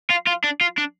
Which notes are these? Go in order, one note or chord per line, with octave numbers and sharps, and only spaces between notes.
F4
F4
D4
F4
D4